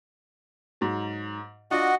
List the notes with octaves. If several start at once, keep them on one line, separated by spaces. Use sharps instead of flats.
G#2 F#3
D4 F4 F#4 D#5 F#5